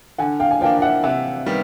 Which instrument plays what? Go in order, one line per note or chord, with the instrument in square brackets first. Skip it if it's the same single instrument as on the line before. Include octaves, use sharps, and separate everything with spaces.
[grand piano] D3 [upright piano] F#5 G#5
[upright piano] F5 G5
G#5
[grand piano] F3 A#3 D4 [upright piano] F5 G5
[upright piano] F5
E5 F#5
[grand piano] C3 [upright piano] E5 F#5
[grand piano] D#3 G3 B3